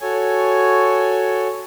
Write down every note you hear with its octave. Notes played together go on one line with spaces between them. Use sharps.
F#4 A4 C#5 G#5